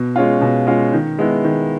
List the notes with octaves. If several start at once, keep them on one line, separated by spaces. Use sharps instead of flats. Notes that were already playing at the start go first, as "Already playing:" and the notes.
Already playing: B2
G#3 C#4 F4
B2
G#3 C#4 F4
D#3
G#3 B3 E4
D#3